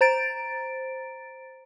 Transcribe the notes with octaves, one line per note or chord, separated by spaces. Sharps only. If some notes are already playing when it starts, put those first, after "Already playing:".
C5 A#5 A6 D7